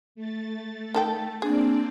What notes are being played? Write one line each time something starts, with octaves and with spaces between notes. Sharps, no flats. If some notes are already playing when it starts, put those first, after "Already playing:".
A3 A6
D#3 A4 G5
A#3 C4 D4 G#4 D5